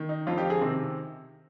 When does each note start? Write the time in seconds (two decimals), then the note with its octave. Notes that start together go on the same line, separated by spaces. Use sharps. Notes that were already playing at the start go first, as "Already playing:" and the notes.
Already playing: D#3
0.09 D#4
0.27 F2 D3 F4
0.38 G4
0.50 G#4
0.61 C3 D#3 C4